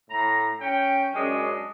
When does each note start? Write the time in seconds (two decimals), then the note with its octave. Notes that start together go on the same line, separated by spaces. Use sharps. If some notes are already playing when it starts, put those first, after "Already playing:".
0.10 A2 A#5
0.60 C#4 G5
1.13 F#2 G#3 C#4 D4